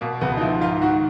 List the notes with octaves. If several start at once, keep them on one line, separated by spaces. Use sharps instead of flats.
B2 A#3
C#2 B3
D#4
F3 E4
G#2 F4
D#3 F#4